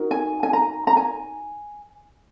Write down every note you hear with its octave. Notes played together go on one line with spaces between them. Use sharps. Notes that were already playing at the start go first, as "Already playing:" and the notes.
Already playing: D#4 F#4 A#4
G#5
G#5
A#5
A#5
G#5